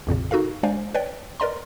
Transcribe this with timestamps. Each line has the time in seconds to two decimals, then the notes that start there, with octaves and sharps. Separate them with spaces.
0.07 A#1 F2 A#2 C#3
0.31 D#4 F#4 A4 A#4 F5
0.63 G#3 D4 C5 D5 F5 G#5
0.95 B4 C#5 D5 G5
1.40 A#4 B4 D5 D#5 A#5 C6